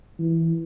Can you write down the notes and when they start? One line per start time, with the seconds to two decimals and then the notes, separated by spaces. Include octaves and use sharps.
0.19 E3